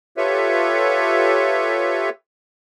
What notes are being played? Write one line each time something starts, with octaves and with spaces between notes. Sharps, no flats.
F4 G4 A4 B4 C#5 E5